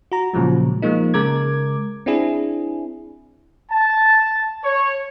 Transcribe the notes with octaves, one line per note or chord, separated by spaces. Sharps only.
F#4 A#5
A#2 C#3 F3 F#3 G#3
F3 G#3 A#3 D#4
C#3 G#3 A#4 D6 G#6
C4 D4 E4 G#4
A5
C#5